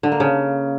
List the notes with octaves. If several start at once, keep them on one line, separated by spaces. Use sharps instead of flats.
D3
A#3
C#3